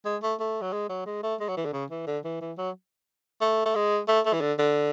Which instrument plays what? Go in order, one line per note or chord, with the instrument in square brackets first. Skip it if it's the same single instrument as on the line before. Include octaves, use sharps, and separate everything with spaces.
[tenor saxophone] G#3
A3
A3
F#3
G#3
F#3
G#3
A3
G#3
F#3
E3
D3
C#3
E3
D3
E3
E3
F#3
A3
A3
G#3
A3
A3
E3
D3
D3